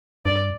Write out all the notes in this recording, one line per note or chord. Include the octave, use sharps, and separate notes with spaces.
G2 D5